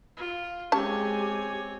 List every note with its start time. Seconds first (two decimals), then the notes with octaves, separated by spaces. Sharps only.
0.17 F4
0.72 G#3 C4 C#4 G4 C#5 G#5 A5